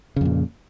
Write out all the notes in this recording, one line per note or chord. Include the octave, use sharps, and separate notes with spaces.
F2 A#2 C#3